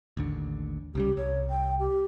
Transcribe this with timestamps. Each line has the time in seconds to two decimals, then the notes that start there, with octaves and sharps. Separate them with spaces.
0.17 A1 D#2 D3
0.95 C2 C#3 G3 G4
1.17 C2 C#5
1.50 G5
1.79 G4